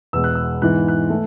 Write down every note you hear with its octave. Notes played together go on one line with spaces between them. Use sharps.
E2 B2 G#3 E6
F#6
E6
G#2 E3 B3 F#6
F#6
A3